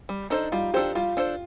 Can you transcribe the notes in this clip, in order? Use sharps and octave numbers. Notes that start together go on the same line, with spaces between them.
G3
D4 D#4 A4 C5
G3 F4
D4 G4 A4 C5
G3 F4
D4 A4 C5